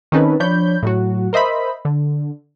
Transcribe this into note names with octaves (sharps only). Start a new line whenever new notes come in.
D#3 C4 C#4 D#4 A4 B4
F3 D4 C#5 B5 G6
A2 F#3 F#4
A#4 C5 D#5 E5 B5
D3